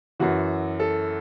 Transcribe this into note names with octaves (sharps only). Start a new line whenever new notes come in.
F#2 E3 F#4
A4